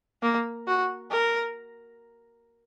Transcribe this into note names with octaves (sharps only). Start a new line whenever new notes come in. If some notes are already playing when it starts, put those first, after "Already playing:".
A#3
F#4
A#4